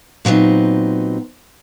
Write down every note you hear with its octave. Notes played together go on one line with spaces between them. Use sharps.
A#2 F#3 B3 C4 D#4